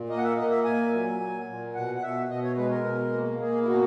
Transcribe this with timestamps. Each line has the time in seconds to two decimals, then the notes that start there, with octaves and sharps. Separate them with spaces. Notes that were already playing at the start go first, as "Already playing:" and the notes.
Already playing: A#2
0.09 A#3 D#5
0.18 F#5
0.24 E5
0.36 A#3 D#5
0.50 E5
0.64 A#2 G#5
0.92 F#3
1.20 A#2
1.48 A#2
1.75 B2 F#5
1.95 F#5
2.02 B2 E5
2.29 B2 D#5
2.43 C#5
2.57 G#3 B4
2.70 A#4
2.84 B2
3.13 A#3
3.39 A#3 G#4
3.62 E4
3.67 B2 F#4